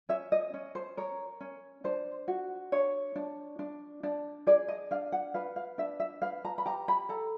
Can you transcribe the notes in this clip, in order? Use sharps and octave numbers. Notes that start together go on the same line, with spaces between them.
C#4 E5
D#5
C#4
C5
A#4 C#5
C#4
D4 C5
F#4
D4 C#5
D4
D4
D4
G#4 D5
D#5
D4 F5
F#5
B4 F5
F5
D4 E5
E5
B4 F5
A#5
B5
G4 A#5
B5
A4 A#5